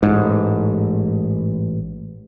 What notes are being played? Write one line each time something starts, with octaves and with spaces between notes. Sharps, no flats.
A1 G#2